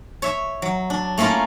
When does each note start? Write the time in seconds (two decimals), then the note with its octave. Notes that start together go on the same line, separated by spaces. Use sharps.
0.22 C#5 E5
0.62 F#3
0.90 D4
1.18 A3 A#3 C#4 E4 F4